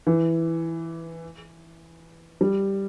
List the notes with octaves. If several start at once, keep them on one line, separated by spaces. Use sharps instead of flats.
E3
G3